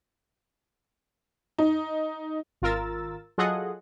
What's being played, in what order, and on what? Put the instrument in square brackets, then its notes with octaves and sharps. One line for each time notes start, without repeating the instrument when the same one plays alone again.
[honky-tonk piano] D#4
[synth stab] G#1 F4 A#4 E6 A6
F#3 F4 G#4 A4 D#5 F#5